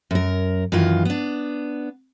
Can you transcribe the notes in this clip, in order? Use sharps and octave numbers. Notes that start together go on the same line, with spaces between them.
F#2 A#4
F#2 D#3 E3 F4
B3 D4